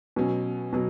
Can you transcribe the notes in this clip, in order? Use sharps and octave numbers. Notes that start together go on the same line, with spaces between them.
B2 F#3 C#4
B2 F#3